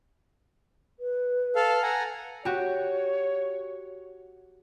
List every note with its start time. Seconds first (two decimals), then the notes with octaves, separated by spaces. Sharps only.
0.99 B4
1.56 A4 F5
1.83 F#5 G#5 A#5
2.45 F#4 G4 C#5